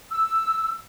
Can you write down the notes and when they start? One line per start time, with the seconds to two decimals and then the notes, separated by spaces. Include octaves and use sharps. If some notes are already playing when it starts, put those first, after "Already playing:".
0.11 E6